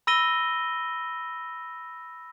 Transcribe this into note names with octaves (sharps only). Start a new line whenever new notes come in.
B5 E6 A#6 D#7 G7